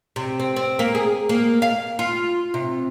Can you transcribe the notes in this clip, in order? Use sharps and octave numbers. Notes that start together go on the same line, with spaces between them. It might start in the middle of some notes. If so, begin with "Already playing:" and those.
C3
C4
C4
A#3
G#4
A#3
F5
F4
C3